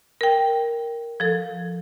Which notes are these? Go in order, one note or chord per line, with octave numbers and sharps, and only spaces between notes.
A#4 G5
F3 A4